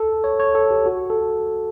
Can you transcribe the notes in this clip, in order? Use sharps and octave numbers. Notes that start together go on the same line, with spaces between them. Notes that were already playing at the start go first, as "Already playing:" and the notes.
Already playing: A4
C#5
C#5
A4
G4
F#4
A4